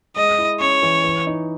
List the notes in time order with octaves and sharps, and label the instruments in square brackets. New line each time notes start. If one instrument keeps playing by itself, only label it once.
[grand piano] G#3 [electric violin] D#5
[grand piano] E4
[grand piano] C#4 [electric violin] C#5
[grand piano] E3
E3
D#4